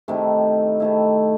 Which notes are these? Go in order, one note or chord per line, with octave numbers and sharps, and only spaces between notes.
C3 D#3 A3 E4
C3 D#3 A3 E4